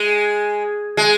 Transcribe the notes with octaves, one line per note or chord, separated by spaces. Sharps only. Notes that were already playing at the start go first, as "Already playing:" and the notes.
Already playing: G#3
G#3